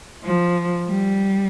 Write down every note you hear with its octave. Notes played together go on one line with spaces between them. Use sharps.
F3
G3